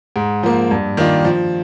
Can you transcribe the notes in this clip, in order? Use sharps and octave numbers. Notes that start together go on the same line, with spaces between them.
G#2
F3 A#3
G2
D#3 A#3 D4 F4
F3